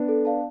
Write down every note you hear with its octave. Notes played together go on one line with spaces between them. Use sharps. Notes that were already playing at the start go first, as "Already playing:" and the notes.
Already playing: B3 D4
A4
D5 F5 A5